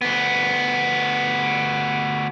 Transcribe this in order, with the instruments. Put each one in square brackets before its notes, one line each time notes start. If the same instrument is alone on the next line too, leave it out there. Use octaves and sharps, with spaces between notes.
[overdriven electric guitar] D2 B3